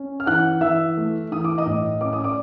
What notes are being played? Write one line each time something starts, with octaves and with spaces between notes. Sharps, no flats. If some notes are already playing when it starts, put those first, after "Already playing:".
Already playing: C#4
F6
E3 F#5 F#6
E3 E5 E6
A3
E3 D#6
D6
D#5 D#6
A2
C#4 D6
D#6
D5 D6